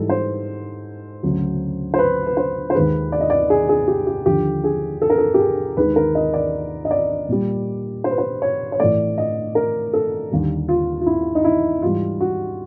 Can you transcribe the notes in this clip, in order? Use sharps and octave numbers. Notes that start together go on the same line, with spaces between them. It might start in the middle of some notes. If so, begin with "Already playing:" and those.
Already playing: G#2 E3 G3 A4
C5
D2 C#3 F#3
C5
B4
B4
C5
C5
D#2 D#3 G#3 B4
D5
D#5
D5
G#4
G#4
G4
G4
D#2 D3 F3 G4
G#4
A4
A#4
A4
G4
G#4
D#2 D#3 G#3 B4
A#4
D#5
D5
D#5
D5
A#2 G3
C5
B4
C5
C#5
C#5
A2 E3 A3 D5
D#5
A#4
A4
D#2 D3 G3
F4
F4
E4
D#4
E4
G#2 E3 G3 F4
F#4